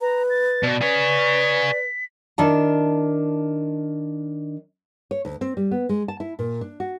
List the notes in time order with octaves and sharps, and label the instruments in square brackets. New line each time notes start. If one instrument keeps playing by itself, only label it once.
[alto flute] B4 [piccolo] A#5
[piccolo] A6
[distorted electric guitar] B2 [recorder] D5
[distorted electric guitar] G#4 C#5 [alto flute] B4 [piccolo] B6
[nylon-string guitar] D#3 D4 E4 A5
C#5
D2
C4
G3
B3
G#3
A5
E4
A#2
D4
F#4